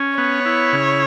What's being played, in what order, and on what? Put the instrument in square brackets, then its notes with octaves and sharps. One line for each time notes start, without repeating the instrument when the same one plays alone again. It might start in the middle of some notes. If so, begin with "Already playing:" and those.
Already playing: [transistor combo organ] C#4
[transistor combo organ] B3 [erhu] C#5
[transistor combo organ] E4
C#3